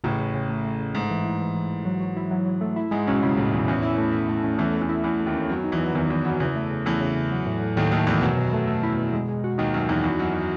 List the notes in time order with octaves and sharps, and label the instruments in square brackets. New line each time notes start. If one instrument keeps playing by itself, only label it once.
[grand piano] A1 A2 [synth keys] C#3
[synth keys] C#3
C#3
A3
A3
C#3
[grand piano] G#2 [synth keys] A3
[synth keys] E3
E4
E3
E3
E3
F#3
F#3
E4
F#3
F#3
A3
E4
[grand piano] G#2 [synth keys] G#3
[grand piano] B1 B2 [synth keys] C#4
[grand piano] C#2 C#3 [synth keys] E4
[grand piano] D#2 D#3 [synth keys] A2
[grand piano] E2 E3 [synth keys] A2
[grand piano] E2 E3 [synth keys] C#4
[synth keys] E4
A3
E4
A3
C#4
[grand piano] E2 E3 [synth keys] A3
[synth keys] A3
[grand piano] E2 E3
[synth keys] E4
[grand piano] E2 E3 [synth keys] E4
[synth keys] A3
[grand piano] D#2 D#3
[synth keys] C#4
[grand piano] F#2 F#3 [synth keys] B3
[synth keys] D#4
[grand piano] E2 E3
[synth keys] B3
[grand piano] F#3
[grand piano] E2 E3 [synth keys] D#3
[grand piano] E2 E3 [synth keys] B3
[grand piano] F#2 F#3 [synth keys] B3
[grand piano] E2 E3 [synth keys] C#3
[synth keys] A3
C#3
[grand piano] E2 E3 [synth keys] A3
[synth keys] C#3
C#3
F#3
A2
A2
[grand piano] D#2 D#3 [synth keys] A2
[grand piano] D#2 D#3 [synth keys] A3
[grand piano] E2 E3 [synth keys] A3
[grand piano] F#2 F#3 [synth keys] B2
[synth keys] B2
A3
A3
E4
B2
G#3
G#3
F#4
[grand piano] D#2 D#3 [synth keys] D#4
[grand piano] F#2 F#3 [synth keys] D#4
[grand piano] E2 E3 [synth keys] D#4
[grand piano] E2 E3 [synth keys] F#4
[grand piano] F#2 F#3 [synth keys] F#4
[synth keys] D#4